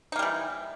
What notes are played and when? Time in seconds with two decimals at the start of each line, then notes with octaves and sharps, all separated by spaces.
0.12 D#4
0.16 A#3
0.19 G3
0.23 E3